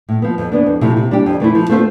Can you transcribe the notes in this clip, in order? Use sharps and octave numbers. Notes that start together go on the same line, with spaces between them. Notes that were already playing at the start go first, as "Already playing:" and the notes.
A2
F3 B3
F2
E3 B3 D4
F2
C3 F3 A3 E4
C3
G3 D4 G4
F2
E3 A3 E4
F3
A3 C4 F4 C5